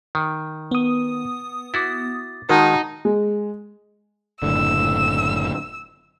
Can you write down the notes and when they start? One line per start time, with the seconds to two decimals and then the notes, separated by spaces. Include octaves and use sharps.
0.15 D#3
0.71 B3 D#6
1.74 E4 F#4 D6 A6
2.49 D#3 G#3 D#4 F#4 A#4 F#5 A5
3.05 G#3
4.42 F#1 A2 D3 E6